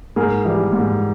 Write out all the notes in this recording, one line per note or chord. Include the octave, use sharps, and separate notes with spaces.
G#2 G#4 A#4
E3 G3
G#2